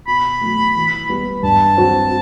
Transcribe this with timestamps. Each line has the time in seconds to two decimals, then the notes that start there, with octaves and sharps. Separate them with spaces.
0.07 B2 B5
0.41 F#3 A3
0.75 E3
1.09 G3 B3
1.43 G2 A5
1.77 F#3 C4 F#4